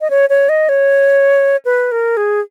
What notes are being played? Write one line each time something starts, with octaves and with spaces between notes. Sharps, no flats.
D#5
C#5
C#5
D#5
C#5
B4
A#4
G#4